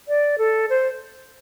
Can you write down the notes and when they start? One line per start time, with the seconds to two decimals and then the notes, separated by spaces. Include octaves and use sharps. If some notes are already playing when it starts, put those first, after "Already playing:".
0.08 D5
0.38 A4
0.70 C5